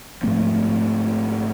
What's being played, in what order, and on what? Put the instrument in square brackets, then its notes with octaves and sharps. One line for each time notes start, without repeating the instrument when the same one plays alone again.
[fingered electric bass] G#2 F3 A3 C4